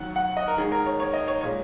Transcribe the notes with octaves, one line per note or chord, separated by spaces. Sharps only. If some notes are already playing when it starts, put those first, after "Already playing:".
Already playing: D#2 D#3 F#3 F#5
F#5
D#5
A#4
D#2 D#3 G#3 G#4
A#4
C#5
C#5
D#5
C#5
A#2 G#3 C#5